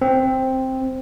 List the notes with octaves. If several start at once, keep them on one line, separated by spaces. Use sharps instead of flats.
C4